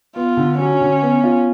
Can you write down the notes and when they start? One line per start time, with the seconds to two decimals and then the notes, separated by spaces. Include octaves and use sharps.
0.15 B3 F4
0.37 D3
0.59 F#3 C#4
0.81 D3
1.02 B3
1.24 F4